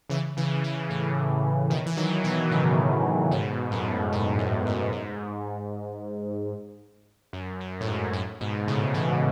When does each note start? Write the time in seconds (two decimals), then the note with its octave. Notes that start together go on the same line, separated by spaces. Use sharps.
0.09 C#3 E3
0.37 C#3 E3
0.64 C#3 E3
0.90 A2 C#3
1.70 B2 D#3
1.86 E3
1.97 D#3 F#3
2.24 B2 D#3
2.51 A2 C#3
3.31 G#2 B2
3.71 F#2 A2
4.12 G#2
4.38 F#2
4.66 G#2
4.92 G#2
7.33 F#2
7.60 F#2
7.81 A2
7.87 G#2
8.13 F#2 A2
8.41 G#2 B2
8.67 A2 C#3
8.94 C#3 E3